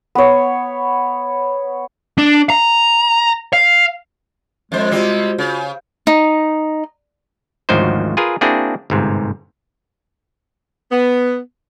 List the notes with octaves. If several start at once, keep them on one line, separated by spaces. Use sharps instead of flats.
B3 C#5
D4
A#5
F5
F2 G#3 C5
C3 G3 C4 F4 F#4
C#3
D#4
G#1 D2 F3 F#3 D#4 C5
F4 G#4 A#4 B4 G#5
A#3 C4 D4 E4 F#4 G#4
G1 G#2 C3
B3